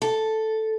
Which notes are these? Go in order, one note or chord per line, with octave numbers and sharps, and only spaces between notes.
A4